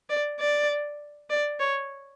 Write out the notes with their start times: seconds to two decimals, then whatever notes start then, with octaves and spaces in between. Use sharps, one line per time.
0.10 D5
0.40 D5
1.30 D5
1.60 C#5